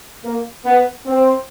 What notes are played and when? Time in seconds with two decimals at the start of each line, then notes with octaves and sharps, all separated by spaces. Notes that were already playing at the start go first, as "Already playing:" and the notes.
0.23 A#3
0.65 B3
1.05 C4